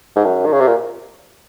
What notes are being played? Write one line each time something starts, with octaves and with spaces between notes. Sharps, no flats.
G#2
F#2
D#3
C#3
C3
A#2